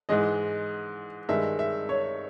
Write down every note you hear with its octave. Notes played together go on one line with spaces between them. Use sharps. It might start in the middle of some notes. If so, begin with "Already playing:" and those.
G#2 E3 G#3 D#5
G2 D#3 G#3 E5
E5
C#5